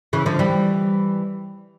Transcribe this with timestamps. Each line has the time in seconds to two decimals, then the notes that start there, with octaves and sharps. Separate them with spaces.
0.13 C#3 E3
0.26 D3 F3
0.39 E3 G3